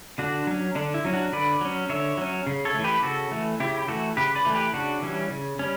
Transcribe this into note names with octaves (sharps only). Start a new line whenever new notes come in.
D3 D4 F#4
F#3 C#4
D3 D4
E4
F#3 C#4
D4 F#4
D3 B4 D5
F#3 C#4
D3 C#5 E5
F#3 C#4
C#3
A4 C#5
E3 A3
G4 B4
C#3 F#4 A4
E3 A3
C#3 E4 G4
G4
E3 A3 F#4 A4
C#3 G4 B4
B4 D5
E3 A3
G4 B4
C#3 D4 F#4
E3 G3 C#4
C#3
G3 C#4